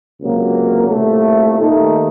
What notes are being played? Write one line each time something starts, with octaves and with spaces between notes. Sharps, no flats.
C#2 C3 F#3 A#3
C2 A#2 A3
D#2 D#3 A3 D#4